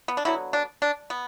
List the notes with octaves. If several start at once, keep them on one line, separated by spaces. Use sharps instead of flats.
B3
D4
D3 F#3 B3 E4
D4
D4
B3